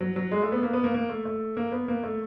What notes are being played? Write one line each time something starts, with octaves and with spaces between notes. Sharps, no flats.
F#3
F#3
G#3
A3
B3
A#3
B3
A#3
A#3
A3
A3
A#3
B3
A#3
A3